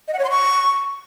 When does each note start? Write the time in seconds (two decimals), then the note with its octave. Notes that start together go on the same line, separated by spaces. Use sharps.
0.08 D#5
0.13 F#5
0.19 C#5
0.24 C6
0.30 C#6